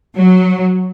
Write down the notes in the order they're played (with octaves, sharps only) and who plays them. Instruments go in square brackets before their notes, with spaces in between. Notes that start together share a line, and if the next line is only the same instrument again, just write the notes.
[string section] F#3